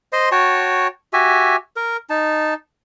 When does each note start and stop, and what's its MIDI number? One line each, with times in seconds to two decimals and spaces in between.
0.13 0.29 72
0.13 0.29 75
0.13 0.29 84
0.32 0.87 66
0.32 0.87 73
0.32 0.87 79
0.32 0.87 81
1.13 1.56 66
1.13 1.56 67
1.13 1.56 76
1.13 1.56 80
1.76 1.97 70
2.10 2.54 63
2.10 2.54 81